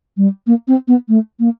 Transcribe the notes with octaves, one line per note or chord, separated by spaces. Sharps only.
G3
A#3
C4
B3
A3
A#3